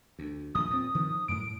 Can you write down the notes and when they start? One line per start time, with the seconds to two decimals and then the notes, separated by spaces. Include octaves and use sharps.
0.19 D2
0.55 D#1 A#1 D#6
0.70 A#2 C4
0.95 D#3 F3
1.28 F#2 A2 D7